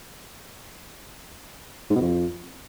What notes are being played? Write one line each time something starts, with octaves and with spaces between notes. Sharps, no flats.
G#2
B2
F2